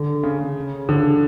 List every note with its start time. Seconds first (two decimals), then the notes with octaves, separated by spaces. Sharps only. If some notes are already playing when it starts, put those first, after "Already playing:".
Already playing: D3
0.23 C#3
0.56 C#3
0.89 D3